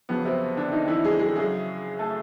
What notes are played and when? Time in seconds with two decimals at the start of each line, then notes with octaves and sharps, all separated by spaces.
0.09 F2 C#3 F#3 B3
0.25 C3 C4
0.57 D3 D4
0.72 D#3 D#4
0.88 E3 E4
1.04 G#3 G#4
1.19 G#3 G#4
1.35 F#2 C#3 F#3 G#3 G#4
1.99 A3 A4